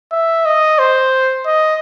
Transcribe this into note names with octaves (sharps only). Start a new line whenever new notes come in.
E5
D#5
C5
D#5